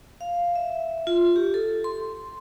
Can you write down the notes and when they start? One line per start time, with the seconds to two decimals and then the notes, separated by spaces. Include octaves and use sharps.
0.21 F5
0.56 E5
1.07 F4
1.36 G4
1.54 A4
1.84 C6